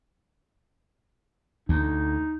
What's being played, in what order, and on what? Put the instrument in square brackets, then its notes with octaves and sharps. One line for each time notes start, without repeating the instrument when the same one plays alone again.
[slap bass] D2 [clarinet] D#4